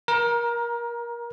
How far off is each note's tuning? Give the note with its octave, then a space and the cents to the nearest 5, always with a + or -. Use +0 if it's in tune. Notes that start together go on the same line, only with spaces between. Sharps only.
A#4 +25 A#5 +10